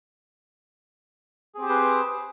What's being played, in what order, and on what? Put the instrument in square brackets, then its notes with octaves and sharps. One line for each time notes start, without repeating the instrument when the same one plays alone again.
[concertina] G#4
C4
G4
C5
B4